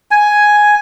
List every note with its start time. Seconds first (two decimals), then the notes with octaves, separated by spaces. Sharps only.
0.11 G#5